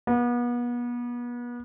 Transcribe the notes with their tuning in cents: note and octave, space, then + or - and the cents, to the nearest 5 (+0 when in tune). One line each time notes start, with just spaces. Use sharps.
B3 -35